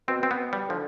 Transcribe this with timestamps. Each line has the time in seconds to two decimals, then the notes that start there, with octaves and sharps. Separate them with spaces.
0.08 B2 C4
0.23 C4
0.31 B3
0.38 B2
0.53 G3
0.69 D3 F3